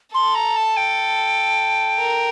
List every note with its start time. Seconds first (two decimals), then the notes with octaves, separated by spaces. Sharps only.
0.14 A4 C6
0.34 A#5
0.56 A5
0.76 G5
1.99 A#4